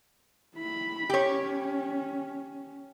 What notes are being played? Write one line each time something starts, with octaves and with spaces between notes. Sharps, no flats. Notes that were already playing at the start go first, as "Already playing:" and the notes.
E4 B5
C#4 G4 C#5